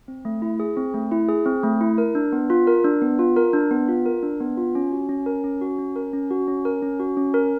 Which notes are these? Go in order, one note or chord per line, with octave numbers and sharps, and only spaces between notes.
C4
A3
E4
G#4
C4
A3
E4
G#4
C4
A3
E4
A#4
D4
B3
F4
A#4
D4
B3
F4
A#4
D4
B3
F4
A#4
D4
B3
F4
C#4
F#4
C#4
A#4
C#4
F#4
C#4
A#4
C#4
F#4
C#4
A#4
C#4
F#4
C#4
A#4